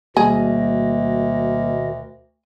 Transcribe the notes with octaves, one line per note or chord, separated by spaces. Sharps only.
D2 B2 D#3 G3 A#3 G#4 D#5